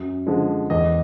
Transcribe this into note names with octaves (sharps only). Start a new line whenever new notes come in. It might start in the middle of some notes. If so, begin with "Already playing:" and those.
Already playing: F#2
D3 F3 G#3
E2 D#5